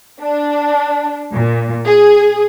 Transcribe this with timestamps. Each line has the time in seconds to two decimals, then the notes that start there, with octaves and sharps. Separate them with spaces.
0.21 D4
1.32 A#2
1.85 G#4